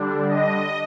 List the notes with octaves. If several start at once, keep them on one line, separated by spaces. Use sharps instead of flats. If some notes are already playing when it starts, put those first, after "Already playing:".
Already playing: D3 G3 D4
D#5